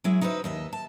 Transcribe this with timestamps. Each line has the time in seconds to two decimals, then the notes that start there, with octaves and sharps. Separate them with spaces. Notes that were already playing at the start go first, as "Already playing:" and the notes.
0.04 F#3 G#3 E4
0.21 D#4 F#4 B4 C5 D5 E5
0.44 D#2 D#5 E5
0.73 A5